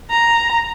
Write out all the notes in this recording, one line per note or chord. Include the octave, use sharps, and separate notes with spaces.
A#5